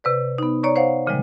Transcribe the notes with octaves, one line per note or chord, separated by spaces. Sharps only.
C3 B4 D5
B3 D#4
C#5 D5 A#5 C#6
C5 C#5 F5 F#5
A#2 C#3 E3 F3 G3 G#3